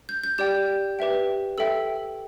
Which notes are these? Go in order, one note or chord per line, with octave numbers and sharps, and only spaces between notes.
G6
G6
G4 D5 G5 G6
G4 B4 E5 G5
A4 E5 G5 E6